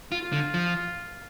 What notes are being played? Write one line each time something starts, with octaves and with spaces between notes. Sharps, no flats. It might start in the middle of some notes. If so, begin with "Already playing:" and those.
F4
F4
D3
F3